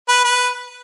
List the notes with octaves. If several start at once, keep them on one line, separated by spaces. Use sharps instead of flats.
B4
B4